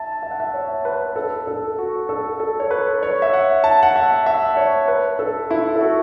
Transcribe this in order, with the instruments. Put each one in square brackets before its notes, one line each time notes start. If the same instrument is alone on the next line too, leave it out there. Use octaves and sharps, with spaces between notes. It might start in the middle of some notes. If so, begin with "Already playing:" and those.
Already playing: [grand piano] E5 A5
E5
F#5
E5
C#5
B4
A4
A4
F#4
A4
A4
C#5
B4
C#5
E5
F#5
A5
F#5
E5
E5
C#5
B4
A4
E4
A4
F#4